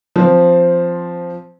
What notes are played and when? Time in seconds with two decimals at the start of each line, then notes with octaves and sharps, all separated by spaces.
0.16 F3 C4